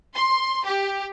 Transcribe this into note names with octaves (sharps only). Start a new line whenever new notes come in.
C6
G4